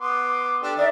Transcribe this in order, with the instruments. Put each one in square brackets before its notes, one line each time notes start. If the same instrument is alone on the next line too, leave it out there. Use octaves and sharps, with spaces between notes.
[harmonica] B3 C6 D6
D4 G4 A4
[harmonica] D#3 [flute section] D5 E5